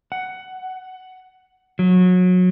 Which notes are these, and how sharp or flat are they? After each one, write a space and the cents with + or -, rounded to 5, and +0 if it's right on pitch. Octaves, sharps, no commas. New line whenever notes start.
F#5 +10
F#3 -25